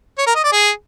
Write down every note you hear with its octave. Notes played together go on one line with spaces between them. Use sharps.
C#5
A#4
D#5
D5
G#4